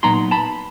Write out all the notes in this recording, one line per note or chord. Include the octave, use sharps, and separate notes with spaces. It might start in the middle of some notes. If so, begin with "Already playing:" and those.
A#2 F#3 B3 D#4 A#5 C6
A5 B5